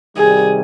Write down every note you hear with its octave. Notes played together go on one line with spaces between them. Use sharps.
C3 D#3 G3 G#4